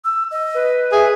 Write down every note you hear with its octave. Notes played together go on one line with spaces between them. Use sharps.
E6
D#5
B4
G#4 E5